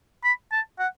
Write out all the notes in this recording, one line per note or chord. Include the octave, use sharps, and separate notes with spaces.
B5
A5
F#5